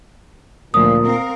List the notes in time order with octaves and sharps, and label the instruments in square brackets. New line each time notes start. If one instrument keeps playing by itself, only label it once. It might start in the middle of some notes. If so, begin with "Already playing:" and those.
[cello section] D2 F3 [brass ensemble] A#2 [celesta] D#6
[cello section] C4 A#4 F5